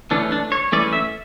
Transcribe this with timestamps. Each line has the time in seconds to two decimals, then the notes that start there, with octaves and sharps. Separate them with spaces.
0.11 E3 A3 C#4 D4
0.32 D4
0.52 C#5
0.72 E3 A3 C#4 D5
0.93 E5